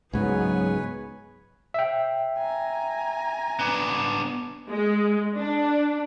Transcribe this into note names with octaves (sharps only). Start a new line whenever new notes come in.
C#2 G#2 F#3 B3 G#4 B4 C#5 G#5
E5 G5
G#5 A#5
B3 D4
G#3
D4